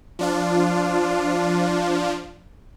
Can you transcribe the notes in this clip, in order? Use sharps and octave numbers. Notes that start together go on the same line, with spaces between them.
F3 D4 F4